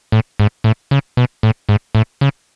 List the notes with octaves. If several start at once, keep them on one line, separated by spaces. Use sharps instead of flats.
A2
G#2
A2
C#3
B2
A2
G#2
A2
C#3